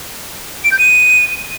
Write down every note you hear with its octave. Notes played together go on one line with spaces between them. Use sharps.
D7
G6
D#7